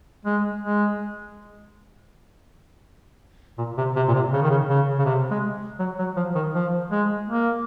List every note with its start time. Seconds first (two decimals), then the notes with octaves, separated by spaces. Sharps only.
0.25 G#3
0.63 G#3
3.58 A#2
3.77 C3
3.96 C3
4.08 A#2
4.14 C3
4.33 C#3
4.42 D#3
4.50 C#3
4.69 C#3
4.99 C#3
5.06 C3
5.31 G#3
5.79 F#3
5.99 F#3
6.16 F3
6.35 D#3
6.54 F3
6.91 G#3
7.28 A#3